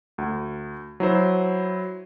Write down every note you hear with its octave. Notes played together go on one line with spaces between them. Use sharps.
D2
F#3 E4 C5